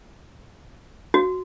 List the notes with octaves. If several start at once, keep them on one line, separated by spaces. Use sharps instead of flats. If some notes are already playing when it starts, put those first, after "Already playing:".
F#4